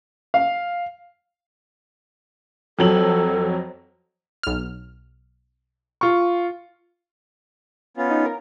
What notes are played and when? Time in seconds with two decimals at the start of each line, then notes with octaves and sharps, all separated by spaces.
0.34 F5
2.79 F2 F#3 A4 F#7
4.43 B1 F6
6.01 F4 C#6
7.97 B3 C#4 F4
8.10 D#4
8.26 A#4